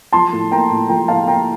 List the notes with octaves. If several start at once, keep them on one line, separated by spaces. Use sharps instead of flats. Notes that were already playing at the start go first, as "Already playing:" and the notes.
F3 A5 C6
A2
A#3 G5 A#5
A2
F3 G5 A#5
A2 F5 A5
A#3 G5 A#5